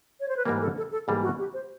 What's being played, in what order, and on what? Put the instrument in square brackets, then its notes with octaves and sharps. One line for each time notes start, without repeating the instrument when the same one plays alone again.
[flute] C#5
C5
B4
[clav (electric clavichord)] G#2 E3 G3 A#3 [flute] A#4
[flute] A4
A4
A4
[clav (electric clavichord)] G#2 E3 G3 A#3 [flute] G#4
[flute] F#4
G4
C5